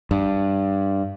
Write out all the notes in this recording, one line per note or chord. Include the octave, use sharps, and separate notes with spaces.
G2